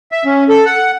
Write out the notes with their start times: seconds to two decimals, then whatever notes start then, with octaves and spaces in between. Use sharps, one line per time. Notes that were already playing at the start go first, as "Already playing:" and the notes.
0.12 E5
0.25 C#4
0.49 A4
0.65 F#5